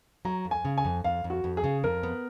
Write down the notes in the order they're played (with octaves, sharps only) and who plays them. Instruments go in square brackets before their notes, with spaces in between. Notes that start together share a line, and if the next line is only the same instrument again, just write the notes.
[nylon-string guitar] F#3 [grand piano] A#5
[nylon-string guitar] F2
[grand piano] G#5
[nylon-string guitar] C#3
[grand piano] G#5
[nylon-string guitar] F2
[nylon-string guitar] F2 [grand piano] F5
[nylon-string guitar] F2
[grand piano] F#4
[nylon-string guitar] F2
[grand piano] G#4
[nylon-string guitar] C#3
[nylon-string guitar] F2 [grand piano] A#4
[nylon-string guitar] B3